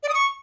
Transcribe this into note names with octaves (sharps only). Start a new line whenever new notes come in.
D5
D#6
C#6